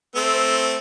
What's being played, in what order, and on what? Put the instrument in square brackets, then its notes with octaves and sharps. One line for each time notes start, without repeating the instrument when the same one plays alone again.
[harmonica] A3 C4 [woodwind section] A#5 C6 E6